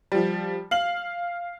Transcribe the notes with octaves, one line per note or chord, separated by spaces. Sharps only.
F3 G3
F5 F#7